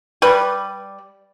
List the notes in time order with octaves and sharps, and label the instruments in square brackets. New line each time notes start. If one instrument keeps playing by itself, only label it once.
[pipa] G3 B4 D5